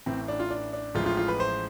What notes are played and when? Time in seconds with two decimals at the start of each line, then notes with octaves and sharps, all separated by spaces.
0.06 A1 A2 E3 C4
0.28 D4
0.40 F4
0.50 D4
0.73 D4
0.95 A1 A2 F3 G#3 F4
1.06 F4
1.17 F4
1.28 B4
1.40 C5